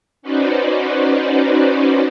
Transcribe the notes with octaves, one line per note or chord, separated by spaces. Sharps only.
C#4 D#4 F#4 B4 C5 D5